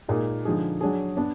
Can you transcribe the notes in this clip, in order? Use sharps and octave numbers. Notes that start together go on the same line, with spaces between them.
A#2 G#3 D#4 G#4
D3 F3 G#3 D#4 G#4
F#3 D4 G#4
B3 D4